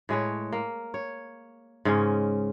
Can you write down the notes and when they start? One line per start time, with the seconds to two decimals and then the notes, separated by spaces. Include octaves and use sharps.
0.09 A2 G#3 B4 C#5
0.52 A#3
0.94 C#5
1.85 G#2 C#3 G#3 C#4